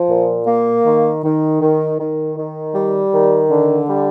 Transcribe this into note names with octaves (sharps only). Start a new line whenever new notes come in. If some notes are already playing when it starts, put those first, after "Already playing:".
Already playing: F3
A#2
A#3
D#3
D#3
D#3
D#3
D#3
G3
D#3
D3
G3